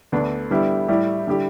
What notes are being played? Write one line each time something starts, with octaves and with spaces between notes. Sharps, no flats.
D2 D3 B3 D4
D3 G3 B3 E4 G4
A2 G3 E4 G4
D3 G3 E4 G4